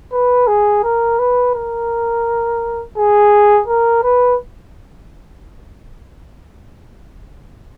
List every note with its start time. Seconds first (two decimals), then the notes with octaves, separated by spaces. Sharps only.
0.13 B4
0.47 G#4
0.84 A#4
1.19 B4
1.55 A#4
2.98 G#4
3.68 A#4
4.04 B4